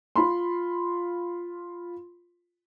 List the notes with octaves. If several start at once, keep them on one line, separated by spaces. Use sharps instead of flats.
F4 B5 C6